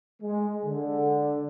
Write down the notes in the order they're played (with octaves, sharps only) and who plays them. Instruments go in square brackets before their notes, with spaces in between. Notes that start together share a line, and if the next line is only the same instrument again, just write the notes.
[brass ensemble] G#3
D3